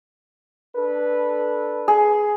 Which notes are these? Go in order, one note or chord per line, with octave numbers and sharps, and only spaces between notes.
D4 A4 B4
G#4